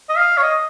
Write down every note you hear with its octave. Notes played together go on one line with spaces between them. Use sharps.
D#5
F5
C#5
D#5